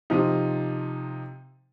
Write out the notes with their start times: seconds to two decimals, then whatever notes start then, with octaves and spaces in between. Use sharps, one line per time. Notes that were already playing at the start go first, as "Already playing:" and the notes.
0.10 C3 F3 D#4